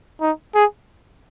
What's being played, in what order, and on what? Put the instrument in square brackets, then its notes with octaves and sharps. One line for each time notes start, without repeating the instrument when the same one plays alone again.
[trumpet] D#4
G#4